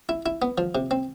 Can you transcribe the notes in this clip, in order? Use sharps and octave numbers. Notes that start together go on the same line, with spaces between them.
E4
E4
B3
F3
C3
C4